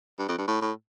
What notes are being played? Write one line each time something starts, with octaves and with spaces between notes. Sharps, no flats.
G2
F2
G2
A2
A2